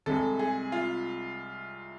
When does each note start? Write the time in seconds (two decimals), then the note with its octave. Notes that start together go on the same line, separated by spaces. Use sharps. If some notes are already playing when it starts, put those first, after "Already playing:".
0.06 C2 C3 G#3 A4
0.39 G#4
0.72 F4